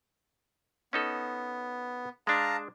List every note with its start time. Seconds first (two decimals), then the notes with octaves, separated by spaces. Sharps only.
0.93 B3 C#4 D#4 A4
2.27 G#3 D4 F5 A5 A#5